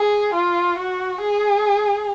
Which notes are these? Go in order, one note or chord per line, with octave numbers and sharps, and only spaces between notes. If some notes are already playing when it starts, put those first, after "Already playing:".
Already playing: G#4
F4
F#4
G#4